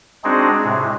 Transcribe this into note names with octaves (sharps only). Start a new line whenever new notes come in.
G#3 C4 D4 D#4 F#4 G#4
A2 C3 G#3